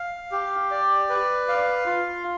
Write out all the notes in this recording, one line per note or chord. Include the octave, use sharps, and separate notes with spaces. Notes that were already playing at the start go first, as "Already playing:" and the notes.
Already playing: F5
G4
D5
B4
F5
F4